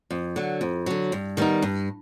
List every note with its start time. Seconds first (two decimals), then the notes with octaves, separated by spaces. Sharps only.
0.11 F2
0.36 D3 F#3
0.61 F2
0.86 D3 F#3
1.12 G2
1.37 D#3 G3 B3 D#4
1.62 G2